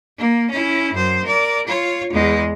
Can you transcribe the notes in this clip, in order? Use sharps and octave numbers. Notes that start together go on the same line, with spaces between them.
A#3
C#4 E4
F#2 C5
A#4 D5
F4 C#5
E2 G#3